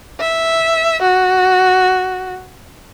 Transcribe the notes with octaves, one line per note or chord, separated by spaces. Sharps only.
E5
F#4